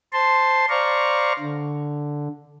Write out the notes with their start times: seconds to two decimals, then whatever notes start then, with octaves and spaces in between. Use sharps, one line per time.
0.13 C5 A5 C6
0.69 C5 D5 F5 A#5 C#6
1.39 D3